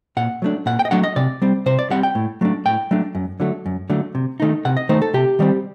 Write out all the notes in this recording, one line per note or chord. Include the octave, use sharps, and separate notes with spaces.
A#2 F#5
F#3 A3 D4
A#2 F#5
G5
D#5
F#3 A3 D4 F#5
D#5
C3 D5
G3 C4
C3 C5
D5
G3 C4 F#5
G5
A2
F#3 A3 D4
A2 G5
F#3 A3 D4
F#2
D3 F#3 A3
F#2
D3 F#3 A3
C3
D#3 A3 D#4
C3 F#5
D#5
D#3 A3 D#4 C5
A4
C3 G4
D#3 G3 C4